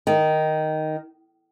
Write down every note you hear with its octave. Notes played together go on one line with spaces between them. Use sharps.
D#3